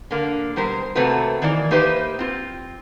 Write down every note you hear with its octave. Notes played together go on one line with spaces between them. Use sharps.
D3 A#3
B2 G3 A#4 C5
C3 A3 A#3 C4 F#4 B4
D#3 E3 A#3 D5
A#3 D#4 G4 B4 C5 E5
C4 F4